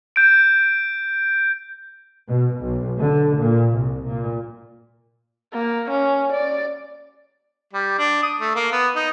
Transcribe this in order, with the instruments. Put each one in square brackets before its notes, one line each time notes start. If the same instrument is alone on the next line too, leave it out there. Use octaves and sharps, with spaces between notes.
[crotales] G6 D7
[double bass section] B2
B1
D3
A#2
C2
A#2
[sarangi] A#3
C#4
D5
[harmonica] G3
D4
D#6
A3
A#3
B3
D#4